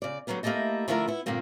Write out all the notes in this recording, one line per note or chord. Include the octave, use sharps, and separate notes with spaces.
C#3 D5
D3 F#3 G3 A#3 B3
A3 A#3 E4 G4 A4 D#5
D3 F3 A3 E4 F4 A#4
B3 E4
G2 A#2 D3 A#3 C4